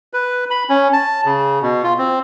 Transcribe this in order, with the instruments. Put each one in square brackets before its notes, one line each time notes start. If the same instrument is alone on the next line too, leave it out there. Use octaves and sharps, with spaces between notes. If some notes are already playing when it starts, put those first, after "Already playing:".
[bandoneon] B4
B5
C#4
A5
C#3
B2
F4
C4